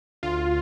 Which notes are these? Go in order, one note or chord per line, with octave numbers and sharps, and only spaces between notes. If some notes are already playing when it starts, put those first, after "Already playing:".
D2 F4